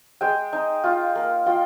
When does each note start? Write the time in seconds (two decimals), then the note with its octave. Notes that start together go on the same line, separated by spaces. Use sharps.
0.21 G#3 G5
0.53 D#4
0.84 F4
1.15 A#3
1.46 F4 G5